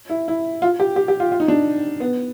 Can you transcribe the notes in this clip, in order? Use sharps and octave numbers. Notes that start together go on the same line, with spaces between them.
E4
E4
F4
G4
G4
G4
F4
F4
D#4
D4
B3